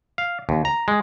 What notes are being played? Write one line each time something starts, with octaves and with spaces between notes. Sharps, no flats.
F5
D#2
A#5
G#3